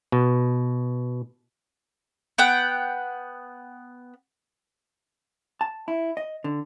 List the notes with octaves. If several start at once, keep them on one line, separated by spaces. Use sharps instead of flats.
B2
B3 F#5 G5
A5
E4
D#5
D3